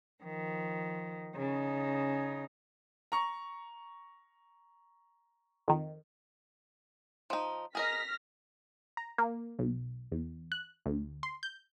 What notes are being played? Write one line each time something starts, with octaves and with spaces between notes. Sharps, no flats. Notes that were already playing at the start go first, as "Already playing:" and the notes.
D#3 F3
C#3 D#4
A#5 C#6
F2 D#3
F3 D#4
G#4 A#4 D#5 F6 A#6 B6
A#5
A#3
B1
E2
F#6
D2
C6
G6